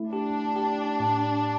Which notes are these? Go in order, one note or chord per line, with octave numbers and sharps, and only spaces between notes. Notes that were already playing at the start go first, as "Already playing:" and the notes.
Already playing: A3 E4
D4 G4
G4
A2